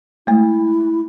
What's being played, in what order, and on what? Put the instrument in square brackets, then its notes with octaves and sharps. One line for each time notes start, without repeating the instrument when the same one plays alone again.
[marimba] G#3 A3 [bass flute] E4